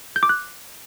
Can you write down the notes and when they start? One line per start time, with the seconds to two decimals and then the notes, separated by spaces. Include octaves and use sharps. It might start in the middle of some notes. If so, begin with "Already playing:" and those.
0.16 G6
0.23 D6
0.29 F#6